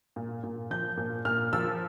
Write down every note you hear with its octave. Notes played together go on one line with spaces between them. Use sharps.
A#2
A#2
F3 G6
A#2
A#2 F6
F3 E6